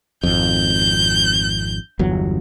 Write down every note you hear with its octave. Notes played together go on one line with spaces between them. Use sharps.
G#1 F2 G6
G1 E2 F#3